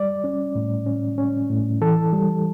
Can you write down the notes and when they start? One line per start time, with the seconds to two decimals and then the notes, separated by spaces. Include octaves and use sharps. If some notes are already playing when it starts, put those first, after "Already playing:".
Already playing: G3 D5
0.24 C#4
0.55 A2
0.86 C#4
1.18 C#4
1.50 A2
1.81 E3 A4
2.13 G3